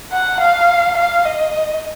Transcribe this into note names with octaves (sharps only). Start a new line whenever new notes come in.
F#5
F5
F5
D#5